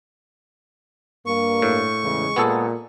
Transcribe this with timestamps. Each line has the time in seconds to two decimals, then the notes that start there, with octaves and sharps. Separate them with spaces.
1.26 G2 A#3 C#6
1.62 A2
2.02 E2 C#3 G#3
2.36 A#2 B3 G#4 A4